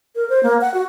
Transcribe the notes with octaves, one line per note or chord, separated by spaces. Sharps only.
A#4
C5
A#3
F#5
F#4